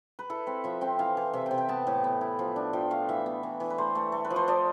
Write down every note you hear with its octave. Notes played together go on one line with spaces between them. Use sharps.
B4
E4 A4
C4 B4
F3 E5
C4 G5
E3 F5
E3
C3 E5
C3 G5
G5
B3 A5
A2
B3
E4
F3
D4
F3 G5
A3 F5
E3 E5
B3
E3
E3
B4
A3 C5
A3
A3
B4
F3
C5
F3 D5